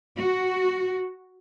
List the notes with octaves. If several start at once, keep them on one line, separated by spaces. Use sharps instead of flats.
F#4